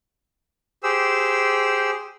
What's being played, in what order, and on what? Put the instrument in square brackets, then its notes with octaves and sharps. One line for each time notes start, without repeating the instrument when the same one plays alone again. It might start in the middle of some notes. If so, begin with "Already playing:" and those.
[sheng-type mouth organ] G4 G#4 C5 E6